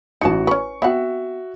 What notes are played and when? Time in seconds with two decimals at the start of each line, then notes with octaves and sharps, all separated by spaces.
0.21 A1 D#4 F#4 A5 C#7
0.47 C#4 B4 C#6
0.82 B3 C4 F#4 E5 F#5